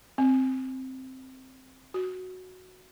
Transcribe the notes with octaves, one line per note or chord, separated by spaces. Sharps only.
C4
F#4